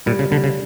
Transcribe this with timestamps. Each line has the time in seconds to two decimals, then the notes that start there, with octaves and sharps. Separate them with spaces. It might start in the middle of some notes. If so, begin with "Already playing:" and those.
0.06 A#2 G3
0.19 C#3
0.31 D3 G3
0.44 C#3